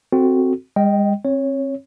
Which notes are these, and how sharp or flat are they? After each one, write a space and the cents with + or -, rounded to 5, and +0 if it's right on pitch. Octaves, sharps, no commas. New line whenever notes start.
C4 +0 F#4 +0 A4 +0
G#3 -45 D#5 +0 G5 -5
C4 +40 C#5 +0